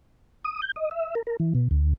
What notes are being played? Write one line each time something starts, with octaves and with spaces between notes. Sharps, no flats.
D#6
G6
D#5
E5
A#4
A#4
E3
B2
D2